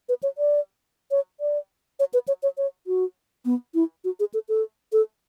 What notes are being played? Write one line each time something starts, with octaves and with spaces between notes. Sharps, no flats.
B4
C#5
D5
C#5
D5
C#5
B4
C#5
C#5
C#5
F#4
B3
E4
F#4
G#4
A4
A4
A4